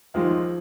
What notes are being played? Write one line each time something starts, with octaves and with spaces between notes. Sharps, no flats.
D#2 D#3 F3 G#3 F4